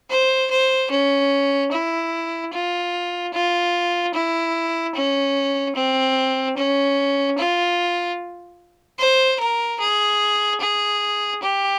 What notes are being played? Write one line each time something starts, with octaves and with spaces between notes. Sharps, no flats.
C5
C5
C#4
E4
F4
F4
E4
C#4
C4
C#4
F4
C5
A#4
G#4
G#4
G4